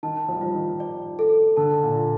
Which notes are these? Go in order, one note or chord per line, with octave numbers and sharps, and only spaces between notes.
D#3 A5
F3
G3
F3 F4
D#3
D5
A4
D3 A5
A#2
F4